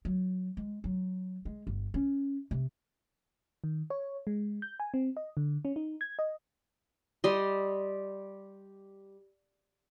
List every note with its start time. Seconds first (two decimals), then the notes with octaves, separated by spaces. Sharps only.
0.05 F#3
0.57 G#3
0.84 F#3
1.45 G#3
1.67 G1
1.94 C#4
2.51 C3
3.64 D#3
3.90 C#5
4.27 G#3
4.62 G6
4.80 G#5
4.94 C4
5.17 D#5
5.37 D3
5.65 C#4
5.76 D#4
6.01 G#6
6.19 D#5
7.24 G3 D#5 C6